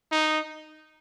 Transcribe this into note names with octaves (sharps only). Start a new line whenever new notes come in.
D#4